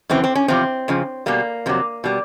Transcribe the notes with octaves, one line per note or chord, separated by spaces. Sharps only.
F#2 C#3 E3 C4
C4
C#4
E2 C3 F3 C4
F2 C#3 F3
B2 G3 A#3
F2 C3 F#3
B2 G3